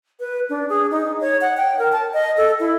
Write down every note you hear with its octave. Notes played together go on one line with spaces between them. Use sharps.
B4
D4
G#4
D#4
C#5
F#5
G5
A#4
A5
D#5
A4
E4